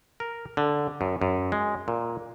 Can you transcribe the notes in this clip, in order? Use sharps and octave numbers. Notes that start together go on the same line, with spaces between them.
A#4
D3
F#2
F#2
G#3
A#2